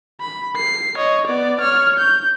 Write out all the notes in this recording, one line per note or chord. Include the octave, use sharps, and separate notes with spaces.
B5
C7
C#5 D#5
B3 D5
C#5 F6
G6